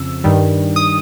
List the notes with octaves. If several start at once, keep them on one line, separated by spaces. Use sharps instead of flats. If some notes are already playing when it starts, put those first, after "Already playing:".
Already playing: F2 C#3 F3 E6
G2 D#3 G3
D#6